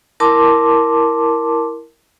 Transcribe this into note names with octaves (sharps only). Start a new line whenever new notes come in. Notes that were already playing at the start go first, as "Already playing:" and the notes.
E4 A#4 A5 C6 D6